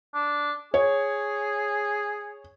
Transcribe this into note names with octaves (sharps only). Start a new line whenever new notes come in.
D4
G#4 C#5